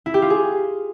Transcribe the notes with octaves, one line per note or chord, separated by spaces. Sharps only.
E4
G4
F4
G#4